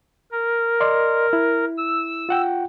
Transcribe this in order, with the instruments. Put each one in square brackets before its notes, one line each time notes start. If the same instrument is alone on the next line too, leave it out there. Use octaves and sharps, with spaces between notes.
[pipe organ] A#4
[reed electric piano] D5 D#5 C6
E4
[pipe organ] E6
[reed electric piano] F4 F#5 G5